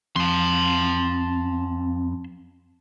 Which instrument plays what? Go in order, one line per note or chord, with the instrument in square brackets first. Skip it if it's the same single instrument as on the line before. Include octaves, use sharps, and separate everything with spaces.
[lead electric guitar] F2 [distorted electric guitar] A5 C6